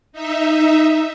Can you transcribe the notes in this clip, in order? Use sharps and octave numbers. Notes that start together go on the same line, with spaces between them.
D#4 E5